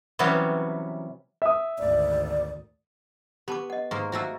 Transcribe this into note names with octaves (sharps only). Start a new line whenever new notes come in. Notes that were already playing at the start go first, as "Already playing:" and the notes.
C3 E3 F#3 G3 B3 C#4
E5 D#6
G#1 D2 D5
B3 G4 A5 D6
D#5 F#5
G#2 A#3 C#6
A3 A#3 F#4 C5 E6